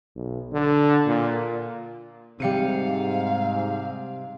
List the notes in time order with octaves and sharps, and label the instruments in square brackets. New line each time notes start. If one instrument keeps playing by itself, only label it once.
[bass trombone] B1
D3
A#2
[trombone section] G#2 [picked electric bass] C3 [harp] G3 C#7 D#7 [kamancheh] F5